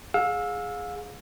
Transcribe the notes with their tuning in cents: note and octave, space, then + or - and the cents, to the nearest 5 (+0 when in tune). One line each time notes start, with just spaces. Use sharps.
G#4 +0 F5 +35 E6 +0